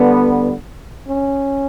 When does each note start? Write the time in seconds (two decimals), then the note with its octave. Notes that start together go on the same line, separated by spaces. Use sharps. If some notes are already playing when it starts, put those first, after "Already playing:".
Already playing: D3 G3 B3
1.07 C#4